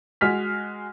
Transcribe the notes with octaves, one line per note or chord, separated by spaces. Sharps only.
G#3 F#4 F6 B6